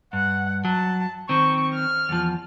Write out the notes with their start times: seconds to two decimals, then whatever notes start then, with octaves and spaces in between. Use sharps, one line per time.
0.13 G2 F#5
0.65 F#3 A5
1.29 D#3 C4 C#6
1.74 F6
2.09 E2 F3